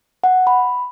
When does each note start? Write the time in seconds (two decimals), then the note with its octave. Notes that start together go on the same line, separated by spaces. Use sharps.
0.24 F#5
0.47 B5